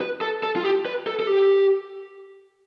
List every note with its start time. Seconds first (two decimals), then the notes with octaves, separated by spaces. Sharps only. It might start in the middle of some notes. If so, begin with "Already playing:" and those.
0.01 B4
0.21 A4
0.43 A4
0.56 F4
0.64 G4
0.85 B4
1.07 A4
1.20 A4
1.27 G4